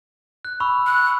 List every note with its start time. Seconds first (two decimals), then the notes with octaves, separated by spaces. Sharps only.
0.45 F#6
0.60 B5 C#6 E6
0.87 F#6